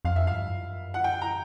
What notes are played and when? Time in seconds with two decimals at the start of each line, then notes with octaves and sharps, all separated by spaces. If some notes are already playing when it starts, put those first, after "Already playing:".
0.05 F2 F5
0.16 E5
0.27 G2 F5
0.54 F#2
0.94 F#5
1.04 G5
1.22 A#5